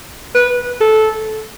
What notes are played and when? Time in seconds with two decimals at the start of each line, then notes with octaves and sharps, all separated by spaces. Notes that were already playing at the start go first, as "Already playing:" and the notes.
0.35 B4
0.81 A4